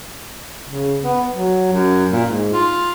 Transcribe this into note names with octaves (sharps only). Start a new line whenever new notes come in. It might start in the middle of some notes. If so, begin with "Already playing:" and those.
C#3
B3
F#3
F#2
A#2
G#2
F4